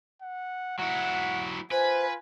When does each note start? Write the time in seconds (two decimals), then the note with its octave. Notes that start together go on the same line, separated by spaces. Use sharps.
0.22 F#5
0.79 F#3 E4 F#5
1.71 F4 B4 C5 G#5